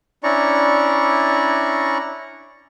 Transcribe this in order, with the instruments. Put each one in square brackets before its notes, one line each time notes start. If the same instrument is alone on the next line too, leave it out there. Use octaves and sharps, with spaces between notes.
[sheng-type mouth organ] C#4 D4 E4 D5 A#5 C#6